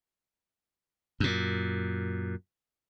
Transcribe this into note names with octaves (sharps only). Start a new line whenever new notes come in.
F#2 A#2